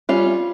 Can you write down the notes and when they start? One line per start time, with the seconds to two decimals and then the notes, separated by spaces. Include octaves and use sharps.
0.09 G3 C#4 F4